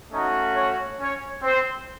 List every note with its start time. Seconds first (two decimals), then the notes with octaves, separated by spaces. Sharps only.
0.11 A3 C#4 D#4 F#4 D#5
0.55 C#4 C#5
0.99 C#4 C#5
1.42 C4 C5